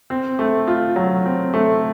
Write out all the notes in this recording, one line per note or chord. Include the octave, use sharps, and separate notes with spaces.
C4
A3
F4
F#3
C4
A3